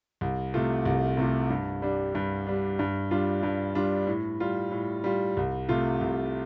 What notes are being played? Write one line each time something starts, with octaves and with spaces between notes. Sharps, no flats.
C2
C3 A3 F4
C2
C3 A3 F4
G2
G3 D4
G2
G3 D4
G2
G3 D4 F4
G2
G3 D4 F4
A2
G3 F4
A2
G3 F4
C2
C3 A3 F4
C2